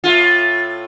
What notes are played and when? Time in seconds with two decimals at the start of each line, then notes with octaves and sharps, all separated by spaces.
0.04 A2 A3 F4